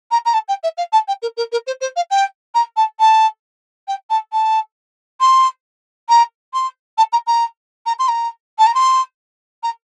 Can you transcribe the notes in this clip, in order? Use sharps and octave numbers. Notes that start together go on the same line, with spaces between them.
A#5
A#5
A5
G5
E5
F5
A5
G5
A#4
A#4
A#4
C5
C5
F5
G5
A#5
A5
A5
G5
A5
A5
C6
A#5
C6
A5
A#5
A#5
A#5
C6
A#5
A5
A#5
C6
A#5